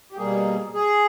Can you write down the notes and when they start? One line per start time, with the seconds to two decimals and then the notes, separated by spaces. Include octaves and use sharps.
0.12 G4
0.17 B2 G3 A#3 G#4
0.74 G#4